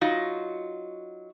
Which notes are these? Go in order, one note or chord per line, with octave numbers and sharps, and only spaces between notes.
F#3 D#4 F4 F#4 D#5